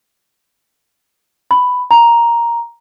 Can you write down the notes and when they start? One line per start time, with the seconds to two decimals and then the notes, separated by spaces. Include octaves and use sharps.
1.51 B5
1.91 A#5